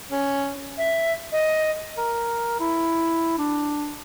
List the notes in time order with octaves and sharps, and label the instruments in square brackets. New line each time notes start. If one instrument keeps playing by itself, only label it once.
[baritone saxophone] C#4
[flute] E5
D#5
[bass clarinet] A#4
E4
D4